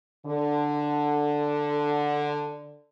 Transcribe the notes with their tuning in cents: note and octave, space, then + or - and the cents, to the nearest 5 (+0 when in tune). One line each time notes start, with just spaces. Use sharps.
D3 +5